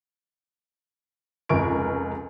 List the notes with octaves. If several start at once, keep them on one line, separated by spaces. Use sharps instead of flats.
F1 C#2 A#4 C#6 D7